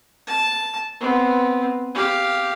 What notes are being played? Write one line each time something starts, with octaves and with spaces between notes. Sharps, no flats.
A5
B3 C4
G4 F5